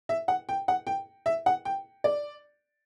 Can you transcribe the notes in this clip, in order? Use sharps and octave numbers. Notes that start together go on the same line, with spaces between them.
E5
F#5
G5
F#5
G5
E5
F#5
G5
D5